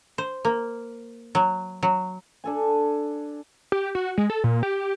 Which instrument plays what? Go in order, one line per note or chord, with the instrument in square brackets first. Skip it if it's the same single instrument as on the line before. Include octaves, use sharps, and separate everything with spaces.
[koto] C5
A#3
F#3
F#3
[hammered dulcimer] D4 A4 G#5
[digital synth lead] G4
F#4
G#3
A4
A#2
G4